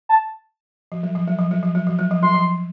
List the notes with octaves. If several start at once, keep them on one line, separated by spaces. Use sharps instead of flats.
A5
F3
F#3
F3
F#3
F3
F#3
F3
F#3
F3
F#3
F3
F#3 C6
F3